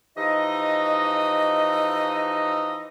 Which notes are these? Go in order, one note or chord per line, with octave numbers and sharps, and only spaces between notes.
E3 F3 D#4 G4 D#5